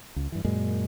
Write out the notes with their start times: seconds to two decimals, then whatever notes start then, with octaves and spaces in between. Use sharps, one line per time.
0.16 C#2
0.32 G2 E3
0.45 F#2 A#2 G#3